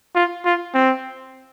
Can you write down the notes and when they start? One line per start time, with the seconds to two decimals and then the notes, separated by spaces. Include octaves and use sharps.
0.15 F4
0.45 F4
0.74 C4